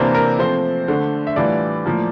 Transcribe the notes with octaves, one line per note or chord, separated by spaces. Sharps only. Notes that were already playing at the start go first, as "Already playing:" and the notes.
Already playing: C3 E3 A#3 D4 C5
A#4
F3 A3 C4 C5
D3 A3 D4
E5
A2 E3 G3 D4 F4 D5
A2 F3 A#3